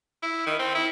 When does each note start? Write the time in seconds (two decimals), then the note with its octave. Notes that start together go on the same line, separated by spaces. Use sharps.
0.23 E4
0.47 D#3
0.60 C4
0.75 E4